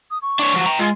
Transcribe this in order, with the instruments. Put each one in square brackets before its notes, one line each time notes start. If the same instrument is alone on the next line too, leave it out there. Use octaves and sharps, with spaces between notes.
[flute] D#6
C#6
[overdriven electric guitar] D4 C#5
F3 F#3
G5 A#5
[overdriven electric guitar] G#3 [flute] F4